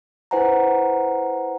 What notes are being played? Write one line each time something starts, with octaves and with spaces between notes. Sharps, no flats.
E4 B4 C5 F#5 G#5 A#5